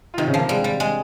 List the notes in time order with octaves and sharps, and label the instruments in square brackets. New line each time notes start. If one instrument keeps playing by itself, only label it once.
[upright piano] F4
[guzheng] C3 [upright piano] D#3 D#4
[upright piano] C#3 C#4
[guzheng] F3 [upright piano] A#3
[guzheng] G3 [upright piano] G#3
[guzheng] G3
G#3